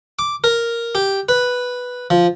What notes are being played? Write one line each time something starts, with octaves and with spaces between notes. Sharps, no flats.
D6
A#4
G4
B4
F3